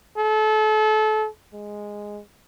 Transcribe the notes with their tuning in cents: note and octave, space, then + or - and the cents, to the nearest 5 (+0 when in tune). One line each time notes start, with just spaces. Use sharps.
A4 -30
G#3 -5